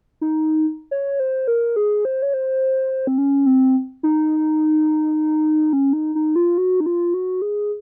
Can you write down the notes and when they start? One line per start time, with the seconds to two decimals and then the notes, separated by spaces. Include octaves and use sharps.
0.21 D#4
0.91 C#5
1.20 C5
1.48 A#4
1.76 G#4
2.05 C5
2.22 C#5
2.34 C5
3.07 C4
3.18 C#4
3.46 C4
4.03 D#4
5.73 C#4
5.93 D#4
6.15 D#4
6.36 F4
6.58 F#4
6.80 D#4
6.86 F4
7.14 F#4
7.42 G#4